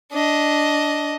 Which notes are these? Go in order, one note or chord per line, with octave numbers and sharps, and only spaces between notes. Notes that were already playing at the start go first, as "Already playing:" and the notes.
D4 D#5